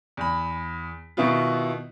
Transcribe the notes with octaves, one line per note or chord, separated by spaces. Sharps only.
E2 B5
B2 D#3 B3 E4 F4